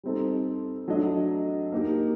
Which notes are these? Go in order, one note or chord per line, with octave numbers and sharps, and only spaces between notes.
G3 C4 D#4 A4
F#3 A3 D4 A4 D#5
A#3 D#4 G4 A#4